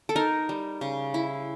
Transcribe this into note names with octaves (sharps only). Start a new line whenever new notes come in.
A4
D#4 A#4
G3
C#3
E4